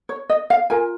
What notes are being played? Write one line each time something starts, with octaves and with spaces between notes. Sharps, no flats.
C#5
D#5
F5
F4 A#4 G#5